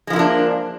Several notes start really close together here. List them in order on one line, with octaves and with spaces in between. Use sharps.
G#3 F3 E4 A#3 D4